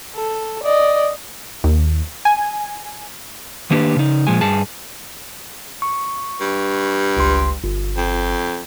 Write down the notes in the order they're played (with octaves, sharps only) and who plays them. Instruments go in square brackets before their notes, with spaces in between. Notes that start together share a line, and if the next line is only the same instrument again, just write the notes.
[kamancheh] A4
D5 D#5
[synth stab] D#2
G#5
[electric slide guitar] D#3 A#3 D4 G4 G#4 B4
C#3 D#4
A#2 F3 G#3 G#5
G2 G#4 A5
[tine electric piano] C#6
[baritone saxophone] G2
[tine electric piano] G1 C#2 C6
G1
[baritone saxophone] F2